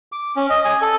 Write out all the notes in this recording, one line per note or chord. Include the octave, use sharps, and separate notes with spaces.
D6
C#4
D#5
G#5
A4